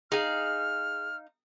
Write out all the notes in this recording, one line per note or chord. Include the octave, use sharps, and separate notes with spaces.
D#4 G#4 F5 F6